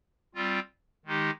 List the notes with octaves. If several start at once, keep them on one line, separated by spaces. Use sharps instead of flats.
G3 C4 F4
D#3 G#3 D#4 G4